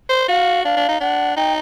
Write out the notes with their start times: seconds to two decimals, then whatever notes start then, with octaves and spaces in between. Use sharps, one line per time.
0.09 C5
0.28 F#4 F5
0.64 D4 F5
0.77 D4
0.88 D#4
1.00 D4 F#5
1.36 D#4 G5